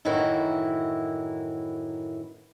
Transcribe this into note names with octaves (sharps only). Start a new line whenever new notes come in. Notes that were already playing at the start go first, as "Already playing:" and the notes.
F#2 A2 D#3 E3 E4 F#4